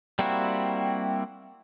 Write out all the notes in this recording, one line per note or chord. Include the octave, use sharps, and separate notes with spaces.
G3 A#3 C4 E4 F#4